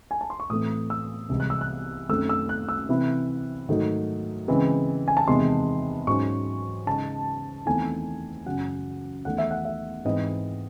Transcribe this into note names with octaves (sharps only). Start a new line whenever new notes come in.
G#5
A5
C6
C#6
A2 E3 A3 C4 D#6
E6
C2 C3 E3 G#3
F#6
E6
F#6
F#2 D#3 A3 C4 E6
E6
F#6
E6
C3 E3 C4 E4
G#2 D#3 F#3 A3 D#4
C#3 E3 G#3 C4
G#5
A5
E2 C3 D#3 G#3 C4 C6
G#2 F#3 C#4 C#6
C#3 G#3 D#4 A5
E2 D#3 A3 C4 E4 G#5
F#2 C#3 F#3 F#5
E2 D#3 A3 D#4 F#5
E5
F#5
E5
G#2 E3 C4 D#4 D#5